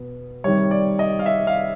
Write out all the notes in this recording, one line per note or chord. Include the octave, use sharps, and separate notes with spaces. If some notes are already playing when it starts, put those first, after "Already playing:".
Already playing: B2 B3
C3 D#3 G3 C#5
D5
D#5
F5
E5
F5